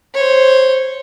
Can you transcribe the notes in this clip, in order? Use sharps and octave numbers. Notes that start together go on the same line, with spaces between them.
C5 C#5